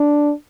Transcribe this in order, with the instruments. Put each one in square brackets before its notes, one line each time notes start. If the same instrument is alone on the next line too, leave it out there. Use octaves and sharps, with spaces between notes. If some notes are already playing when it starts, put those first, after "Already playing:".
Already playing: [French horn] D4